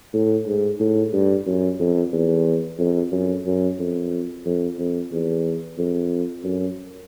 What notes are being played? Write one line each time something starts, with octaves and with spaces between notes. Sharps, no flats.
A2
G#2
A2
G2
F#2
F2
E2
F2
F#2
F#2
F2
F2
F2
E2
F2
F#2